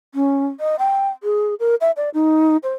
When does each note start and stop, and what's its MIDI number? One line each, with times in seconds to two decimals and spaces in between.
0.15 0.46 61
0.60 0.76 75
0.79 1.09 79
1.23 1.55 68
1.60 1.75 70
1.81 1.91 76
1.97 2.10 74
2.14 2.57 63
2.63 2.74 72